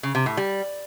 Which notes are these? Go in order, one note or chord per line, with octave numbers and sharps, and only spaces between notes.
C#3
C3
A2
G3